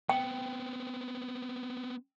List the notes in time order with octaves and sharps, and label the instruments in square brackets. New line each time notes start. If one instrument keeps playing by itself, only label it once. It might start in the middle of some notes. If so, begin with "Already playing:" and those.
[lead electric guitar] B3 C4 [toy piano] G5